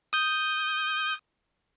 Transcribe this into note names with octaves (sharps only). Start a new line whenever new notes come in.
D#6 G6